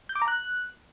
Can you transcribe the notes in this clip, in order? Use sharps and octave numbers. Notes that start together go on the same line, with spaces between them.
G6
D6
A#5
F#6